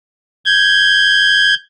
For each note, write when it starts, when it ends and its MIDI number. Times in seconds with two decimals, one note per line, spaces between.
0.45 1.54 91
0.45 1.54 92